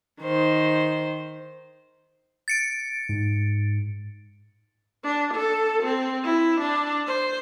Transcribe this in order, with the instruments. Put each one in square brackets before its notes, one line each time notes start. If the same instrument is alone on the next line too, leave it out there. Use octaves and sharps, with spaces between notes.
[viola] D#3 C5
[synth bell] A6 C#7 D7
[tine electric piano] G#2
[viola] D4
A4
C4
E4
D4
C5